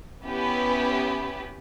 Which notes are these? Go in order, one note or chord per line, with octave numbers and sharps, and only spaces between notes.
B3 C#4 E4 G4 B4